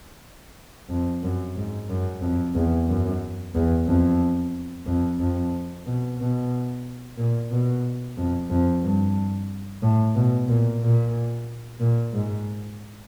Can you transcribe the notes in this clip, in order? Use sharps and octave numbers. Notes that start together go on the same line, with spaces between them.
F2
F#2
G#2
F#2
F2
E2
F#2
E2
F2
F2
F2
B2
B2
A#2
B2
F2
F2
G2
A2
B2
A#2
A#2
A#2
G#2